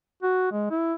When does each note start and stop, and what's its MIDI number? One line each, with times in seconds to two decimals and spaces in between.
0.23 0.51 66
0.52 0.68 56
0.70 0.94 64